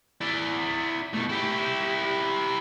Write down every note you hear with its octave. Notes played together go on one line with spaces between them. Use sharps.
E4 D5
B2 A3
E4 G4